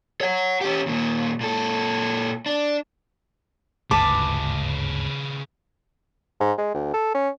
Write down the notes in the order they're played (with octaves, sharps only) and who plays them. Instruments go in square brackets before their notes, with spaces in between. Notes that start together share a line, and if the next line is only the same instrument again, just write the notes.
[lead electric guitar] C#5 F#5
C#4 G4
D#2 A#2
A#2 A4
D4
[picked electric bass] G1 D2 G#2 [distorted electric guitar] C#3 B4 [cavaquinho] A5 D6
[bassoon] G#2
G#3
D2
A4
C#4